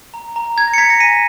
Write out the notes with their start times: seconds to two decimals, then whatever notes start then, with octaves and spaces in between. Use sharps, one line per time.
0.14 A#5
0.36 A#5
0.56 A#5 G#6
0.68 A#6
0.74 C#7
0.78 A#5 G#6 B6
0.89 A#6 C#7
1.00 G#5 B6 D#7